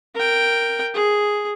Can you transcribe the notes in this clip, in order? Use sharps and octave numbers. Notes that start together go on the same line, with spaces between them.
A#4 G5
G#4